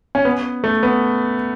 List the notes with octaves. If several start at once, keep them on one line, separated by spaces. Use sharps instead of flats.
C#4
B3
A3
B3